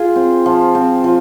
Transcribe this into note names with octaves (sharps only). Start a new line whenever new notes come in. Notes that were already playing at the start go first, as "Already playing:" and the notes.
Already playing: F4 G#4
C4
F3
C4
F3